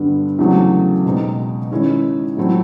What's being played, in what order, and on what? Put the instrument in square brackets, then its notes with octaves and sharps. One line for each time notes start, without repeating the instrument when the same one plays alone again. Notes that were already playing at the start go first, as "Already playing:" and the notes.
Already playing: [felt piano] G2 D3 G3 B3
E2 C#3 F#3 A3 C4
B2 G#3 C4 D#4
D#3 G#3 C#4 E4
A2 F#3 A3 C4 E4